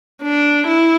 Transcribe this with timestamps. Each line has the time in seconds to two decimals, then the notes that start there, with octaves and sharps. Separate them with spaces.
0.22 D4
0.67 E4